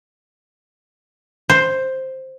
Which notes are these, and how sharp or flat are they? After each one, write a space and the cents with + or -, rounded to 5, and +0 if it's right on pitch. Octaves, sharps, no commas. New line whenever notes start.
C5 +5